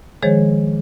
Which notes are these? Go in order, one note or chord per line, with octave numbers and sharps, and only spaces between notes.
D#3 F3 G#3 G#4 C5 C#5